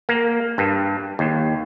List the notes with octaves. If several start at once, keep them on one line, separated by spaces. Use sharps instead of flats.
A#3
G2
D#2